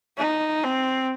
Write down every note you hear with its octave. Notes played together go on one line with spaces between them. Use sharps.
D#4
C4